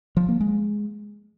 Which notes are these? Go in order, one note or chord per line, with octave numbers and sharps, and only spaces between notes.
F3
A#3
G#3